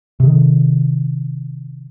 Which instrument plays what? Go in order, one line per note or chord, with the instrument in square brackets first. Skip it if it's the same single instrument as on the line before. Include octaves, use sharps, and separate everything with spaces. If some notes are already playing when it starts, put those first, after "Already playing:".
[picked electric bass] C3 D#3